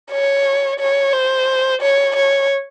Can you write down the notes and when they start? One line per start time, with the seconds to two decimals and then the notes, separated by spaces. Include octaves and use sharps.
0.11 C#5
0.79 C#5
1.13 C5
1.81 C#5
2.16 C#5